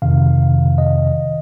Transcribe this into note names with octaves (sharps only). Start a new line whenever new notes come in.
F2 C3 D#3 F5
D#5